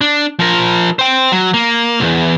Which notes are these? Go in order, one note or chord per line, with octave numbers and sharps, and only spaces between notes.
D4
F3 A#4
C5 G5
F#3
A#3
B1 E2